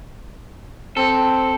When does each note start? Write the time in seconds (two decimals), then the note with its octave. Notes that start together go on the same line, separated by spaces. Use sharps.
0.97 C4 A4